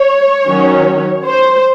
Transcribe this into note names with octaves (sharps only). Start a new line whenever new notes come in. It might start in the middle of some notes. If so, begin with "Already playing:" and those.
Already playing: C#5
D#3 F#3 C#4
C5